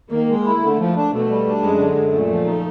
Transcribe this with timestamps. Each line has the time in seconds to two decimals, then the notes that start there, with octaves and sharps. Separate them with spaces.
0.12 D#3 A#3
0.29 G#3
0.46 E4
0.62 D3 A3
0.79 F3
0.96 D4
1.12 B2 A3
1.29 G3
1.46 D4
1.62 F#2 G#3
1.78 D3
1.96 F#2
2.12 A#2 A3
2.29 F3
2.46 D#4